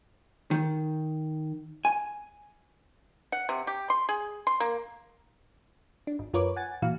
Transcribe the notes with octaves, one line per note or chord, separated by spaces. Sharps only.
D#3
G#5
F#5
C3
G4
C6
G#4
C6
A#3
D4
G#1
F#2 F4 A#4 B4 C#5 D6
F#5 G#5 A6
A#2 E3 F#4 F5